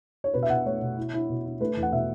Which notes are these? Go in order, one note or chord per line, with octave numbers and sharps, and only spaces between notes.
C#5
B2 B4
E5
B2 F#5
A3 C#5
B2
E4
E4
B2
E4
A3 B4
E2
F#5
B2 E5